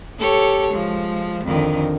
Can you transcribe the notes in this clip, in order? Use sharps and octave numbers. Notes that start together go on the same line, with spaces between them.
G4 A4 C#5
F3 G#3
F2 D3 D#3